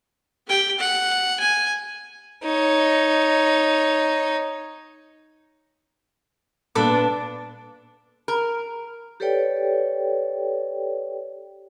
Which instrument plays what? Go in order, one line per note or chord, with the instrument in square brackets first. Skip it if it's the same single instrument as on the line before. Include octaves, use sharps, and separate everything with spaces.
[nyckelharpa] G4 G5
F#5
G#5
[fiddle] D#4 C#5
[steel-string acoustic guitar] A#2 A#3 B3 [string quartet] D4 [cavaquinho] A4 B4 D6
[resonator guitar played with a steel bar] A#4
[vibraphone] G4 A4 B4 C#5 D5 G5